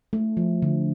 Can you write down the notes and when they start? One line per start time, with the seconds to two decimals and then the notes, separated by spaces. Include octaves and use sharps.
0.13 A3
0.37 F3
0.62 D3